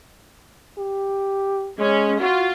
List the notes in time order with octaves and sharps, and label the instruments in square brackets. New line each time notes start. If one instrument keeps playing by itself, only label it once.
[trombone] G4
[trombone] G#3 [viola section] C#4
[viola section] F4 [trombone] F#4